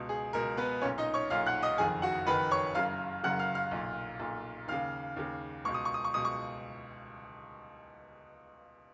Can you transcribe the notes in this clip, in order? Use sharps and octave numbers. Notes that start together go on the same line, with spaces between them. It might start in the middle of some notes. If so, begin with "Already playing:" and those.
Already playing: C#2 B2
G#4
C#2 B2 A#4
B3 B4
B1 A#2 C#4 C#5
D#4 D#5
C#5 C#6
B1 A#2 F5 F6
F#5 F#6
D#5 D#6
F#1 F2 D#3 G#4 G#5
F#4 F#5
F#1 F2 D#3 B4 B5
C#5 C#6
F#1 F#2 C#3 F5 F6
F#1 F#2 C#3 F#5 F#6
F5 F6
F5 F6
B1 A#2
B1 A#2
D#2 C#3 F5 F6
D#2 C#3
C#2 B2 C#6
D#6
C#6
D#6
C#6
C#2 B2 D#6
C#6